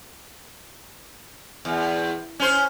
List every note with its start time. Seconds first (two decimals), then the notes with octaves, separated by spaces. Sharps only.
1.65 E2
2.40 C#4 C5